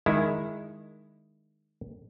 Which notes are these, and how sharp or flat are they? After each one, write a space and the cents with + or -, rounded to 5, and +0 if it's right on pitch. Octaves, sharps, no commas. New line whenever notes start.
D#3 -5 G#3 +0 E4 +0